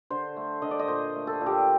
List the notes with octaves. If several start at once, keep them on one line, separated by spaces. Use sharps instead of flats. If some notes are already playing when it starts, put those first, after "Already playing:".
D3 C5
A3
D3 D#5
D5
D#5
A#2 C5
A3
A4
A#2
G4